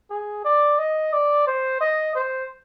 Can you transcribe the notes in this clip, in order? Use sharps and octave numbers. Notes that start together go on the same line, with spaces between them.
G#4
D5
D#5
D5
C5
D#5
C5